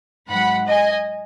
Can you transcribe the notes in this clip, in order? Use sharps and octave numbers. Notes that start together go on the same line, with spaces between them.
G#2 F#3 F#5 B5
D#5 G#5